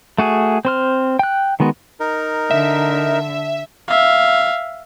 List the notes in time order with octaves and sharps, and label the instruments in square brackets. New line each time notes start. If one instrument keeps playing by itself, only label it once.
[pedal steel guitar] A3 F#4 G#4
C4 C5 F6
G5 F#6
D#3 G#3 B3 F#4
[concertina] D#4 A#4
[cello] D3 [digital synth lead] E5
[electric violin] E5 F5